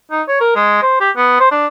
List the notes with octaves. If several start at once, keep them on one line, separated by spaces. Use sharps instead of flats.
D#4
C#5
A#4
G#3
C5
G4
B3
C5
D4